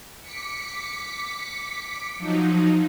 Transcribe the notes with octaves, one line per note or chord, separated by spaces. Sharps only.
D6 B6 C#7
F3 F#3 D#4